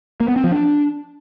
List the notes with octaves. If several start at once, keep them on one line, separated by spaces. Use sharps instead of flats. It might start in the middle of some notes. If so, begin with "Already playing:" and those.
A#3
B3
C4
F3
D4